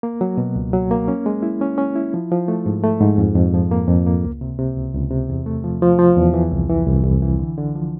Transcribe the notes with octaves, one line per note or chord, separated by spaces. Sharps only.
A#3
F#3
B2
C#2
F#3
A#3
C#4
G#3
E4
C#4
C#4
E4
F3
F3
A3
G#2
A3
G#2
F2
F2
F3
A#3
F2
A#3
C#2
C3
C3
C#2
C#2
C3
E2
A3
F3
F3
F3
E2
E3
C2
E3
C2
C2
E3
D3
D3
F3